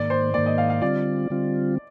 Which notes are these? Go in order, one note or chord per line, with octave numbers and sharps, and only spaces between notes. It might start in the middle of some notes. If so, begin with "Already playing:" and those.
Already playing: G#2 D#3 A#3 D5
C5
G#2 D#3 A#3 D5
D#5
F5
F5
D3 G3 C4 F4 D5
D3 G3 C4 F4